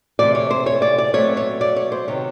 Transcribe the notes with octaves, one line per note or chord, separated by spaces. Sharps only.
C3 E3 A3 C4 D5
C#5
C5
C#5
D5
D5
B2 F#3 A3 C4 C#5
C#5
D5
C#5
C5
C3 D#3 F#3 B3 C#5